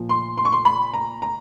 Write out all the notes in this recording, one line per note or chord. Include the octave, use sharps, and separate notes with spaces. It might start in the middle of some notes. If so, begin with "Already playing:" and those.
Already playing: A#2 F3
C6
C6
C#6
C6
B5
A#5
A#5